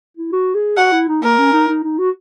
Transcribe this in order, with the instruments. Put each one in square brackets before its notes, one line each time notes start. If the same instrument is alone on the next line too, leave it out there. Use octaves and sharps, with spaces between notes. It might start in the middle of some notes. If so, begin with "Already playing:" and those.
[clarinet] E4
F#4
G#4
[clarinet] F#4 [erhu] F#5
[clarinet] E4
D#4
[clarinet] A#3 [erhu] A#4
[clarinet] C#4
D#4
D#4
D#4
F#4